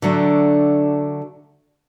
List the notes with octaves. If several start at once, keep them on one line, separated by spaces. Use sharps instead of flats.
D3 F#3 A3 D4